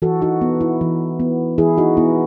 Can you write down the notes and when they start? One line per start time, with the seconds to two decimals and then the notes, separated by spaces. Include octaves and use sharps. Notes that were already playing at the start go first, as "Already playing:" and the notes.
0.02 E3 F#4 A4
0.22 D#4 F#4
0.41 B3
0.61 E4
0.81 E3
1.20 B3
1.58 E3 E4 G#4
1.78 D#4 F#4
1.97 B3 E4